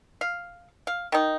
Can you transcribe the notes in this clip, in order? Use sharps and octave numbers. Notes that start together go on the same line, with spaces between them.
F5
F5
D#3 D#4